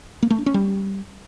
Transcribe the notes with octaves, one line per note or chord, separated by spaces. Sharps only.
A#3
A3
D4
C#4
G3